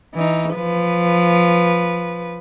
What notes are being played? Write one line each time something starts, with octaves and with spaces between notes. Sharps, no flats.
E3 D#4
F3 B4